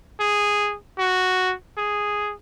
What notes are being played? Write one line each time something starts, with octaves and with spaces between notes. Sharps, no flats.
G#4
F#4
G#4